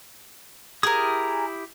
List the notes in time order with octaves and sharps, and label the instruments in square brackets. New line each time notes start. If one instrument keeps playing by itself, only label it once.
[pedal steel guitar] E4 G4 D#6 [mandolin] G#4 A#4